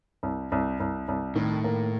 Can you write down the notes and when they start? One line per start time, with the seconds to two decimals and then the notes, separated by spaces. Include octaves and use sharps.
0.23 C2
0.52 C2
0.80 C2
1.08 C2
1.36 A2 D#3
1.64 A#3